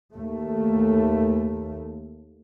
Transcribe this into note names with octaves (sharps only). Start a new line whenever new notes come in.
D#2 A3